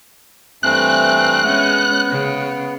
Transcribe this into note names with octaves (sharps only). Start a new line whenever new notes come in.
G2 E3 A3 C4 F#6
G#3 B3 C#4
C#3